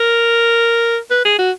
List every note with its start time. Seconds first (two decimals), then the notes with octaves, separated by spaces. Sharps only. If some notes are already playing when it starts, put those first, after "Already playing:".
Already playing: A#4
1.10 B4
1.25 G#4
1.39 F#4